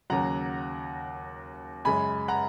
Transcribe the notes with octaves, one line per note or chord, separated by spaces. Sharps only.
D#2 C#3 F#3 F#5 A#5
F#2 C#3 G#3 G#5 B5
F#5 A#5